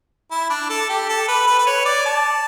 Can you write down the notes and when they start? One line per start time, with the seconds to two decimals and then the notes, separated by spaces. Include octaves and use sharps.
0.31 E4
0.50 D4
0.70 A4
0.89 G4
1.09 A4
1.28 B4
1.47 B4
1.59 B4
1.67 C#5
1.85 D5
2.06 A5